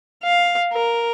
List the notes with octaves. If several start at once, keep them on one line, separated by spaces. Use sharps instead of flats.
F5
A#4